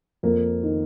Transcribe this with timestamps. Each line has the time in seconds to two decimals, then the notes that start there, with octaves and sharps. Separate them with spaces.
0.23 F2 A#3
0.63 D#3